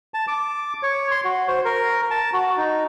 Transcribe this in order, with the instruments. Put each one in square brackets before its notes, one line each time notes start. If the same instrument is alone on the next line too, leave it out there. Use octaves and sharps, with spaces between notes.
[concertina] A5
D6
C#5
C6
F#4
C5
A#4
A5
F#4
D#4